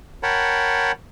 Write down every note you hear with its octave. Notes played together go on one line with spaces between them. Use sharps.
A#4 C#5 F#5 G5 A5 B5